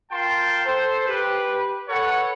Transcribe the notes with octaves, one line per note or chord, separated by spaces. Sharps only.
F4 A#4 G5 A5 C6
A4 C5
G4 B4
A4 B4 C#5 F#5